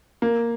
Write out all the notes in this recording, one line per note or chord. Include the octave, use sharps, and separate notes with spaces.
A#3